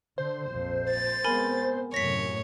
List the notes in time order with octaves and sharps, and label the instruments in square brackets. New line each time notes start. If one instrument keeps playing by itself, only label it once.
[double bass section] D3 [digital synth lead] C5
[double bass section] A#1 F2 A#2
[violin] A6
[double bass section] G#3 B3 C4 [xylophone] A#4 G#5 B5
[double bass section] F#2 A2 C3 [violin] C#5 [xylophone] A#6 B6